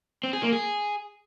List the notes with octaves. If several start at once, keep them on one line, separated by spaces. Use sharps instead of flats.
C4
G#4
A#3
G#4